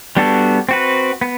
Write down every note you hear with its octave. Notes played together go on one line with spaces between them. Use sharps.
G3 B3 D4 F#4 A4
C4 F#4 B4
B3